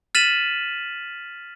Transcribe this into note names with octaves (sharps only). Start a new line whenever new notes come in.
F6 A6 B6 D#7 E7 F#7